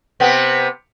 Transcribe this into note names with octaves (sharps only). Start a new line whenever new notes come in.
C3 B3 C4